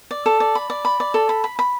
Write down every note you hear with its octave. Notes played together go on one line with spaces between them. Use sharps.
D5
A4
D5
B5
D5
B5
D5
A4
B5
B5
B5